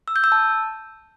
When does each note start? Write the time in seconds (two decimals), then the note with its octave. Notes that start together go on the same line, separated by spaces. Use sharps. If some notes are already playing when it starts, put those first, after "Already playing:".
0.08 E6
0.16 G6
0.24 E6
0.32 A5